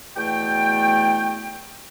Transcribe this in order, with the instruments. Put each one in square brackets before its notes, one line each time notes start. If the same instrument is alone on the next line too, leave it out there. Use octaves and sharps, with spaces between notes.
[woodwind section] E2 B2 A3 G5